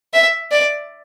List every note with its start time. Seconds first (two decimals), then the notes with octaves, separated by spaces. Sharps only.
0.14 E5
0.52 D5